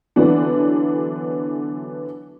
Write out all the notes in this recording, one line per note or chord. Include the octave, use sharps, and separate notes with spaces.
D3 E3 F#3 B3 D4